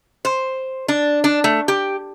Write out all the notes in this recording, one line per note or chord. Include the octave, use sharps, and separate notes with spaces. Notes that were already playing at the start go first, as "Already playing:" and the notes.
C5
D4
D4
A3
G4